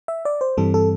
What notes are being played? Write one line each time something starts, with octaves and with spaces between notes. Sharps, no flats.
E5
D5
C5
G2 E3 G3 C4 A4
A4